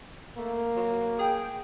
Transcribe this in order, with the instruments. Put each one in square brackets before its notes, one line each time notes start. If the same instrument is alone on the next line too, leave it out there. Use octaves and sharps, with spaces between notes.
[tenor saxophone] A3 [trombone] A#3
[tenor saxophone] F#3
[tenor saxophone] G#4 [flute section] G5